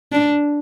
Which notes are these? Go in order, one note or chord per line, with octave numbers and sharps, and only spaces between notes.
D4